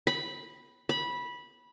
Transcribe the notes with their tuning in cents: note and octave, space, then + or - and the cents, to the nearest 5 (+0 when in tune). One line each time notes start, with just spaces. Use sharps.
B5 -5
B5 -15